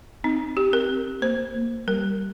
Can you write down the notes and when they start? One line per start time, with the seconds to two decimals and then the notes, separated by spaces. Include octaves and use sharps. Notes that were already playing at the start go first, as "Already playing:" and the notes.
0.24 C4 D#4
0.57 G4
0.73 A#4
0.89 C4
1.22 A#3 C5
1.55 A#3
1.88 G3 A#4